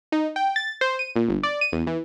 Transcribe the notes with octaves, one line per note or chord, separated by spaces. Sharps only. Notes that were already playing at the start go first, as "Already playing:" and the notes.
D#4
G5
A6
C5
D#7
A#2
G1
D5
D#7
E2
E3